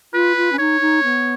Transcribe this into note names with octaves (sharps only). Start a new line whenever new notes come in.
F4 B4
F4
C#4
D#4 C#5
D#4
B3